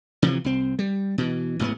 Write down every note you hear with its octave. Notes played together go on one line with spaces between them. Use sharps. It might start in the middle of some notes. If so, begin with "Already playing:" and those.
C3 E3 F3
C2 C4
G3
B2 E3
A1 G#2 A#3 B3